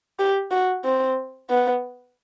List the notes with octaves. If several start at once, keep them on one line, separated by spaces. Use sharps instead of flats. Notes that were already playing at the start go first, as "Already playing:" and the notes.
G4
F#4
C4
B3